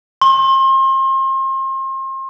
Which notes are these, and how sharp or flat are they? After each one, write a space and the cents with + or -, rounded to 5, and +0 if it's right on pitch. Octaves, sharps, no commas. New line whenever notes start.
C6 +35